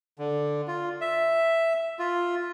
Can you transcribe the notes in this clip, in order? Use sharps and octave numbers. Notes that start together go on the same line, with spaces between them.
D3
F4
E5
F4